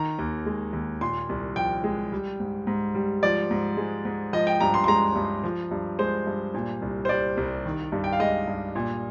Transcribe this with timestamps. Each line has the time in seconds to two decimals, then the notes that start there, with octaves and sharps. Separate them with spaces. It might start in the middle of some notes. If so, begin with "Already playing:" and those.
Already playing: D#3 A#5
0.19 D#2
0.46 G#3
0.73 D#2
1.01 A#2 C6
1.29 C2
1.56 F3 G5
1.84 G#3
2.12 G3
2.40 G#2
2.67 G#2
2.95 G3
3.23 F3 D5
3.51 G#2
3.77 G#3
4.05 G#2
4.33 F3 D#5
4.47 G5
4.60 G2 A#5
4.74 C6
4.84 C6
4.88 G#3 A#5
5.16 G2
5.44 F3
5.71 G2
5.99 G#3 C5
6.27 G2
6.54 A#2
6.82 C2
7.05 C5
7.09 G3 D5
7.37 C2
7.65 D#3
7.92 G2
8.04 G5
8.13 F5
8.19 G#3 D#5
8.47 G2
8.75 A#2